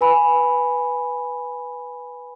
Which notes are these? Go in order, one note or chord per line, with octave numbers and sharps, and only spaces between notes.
B4 G#5 B5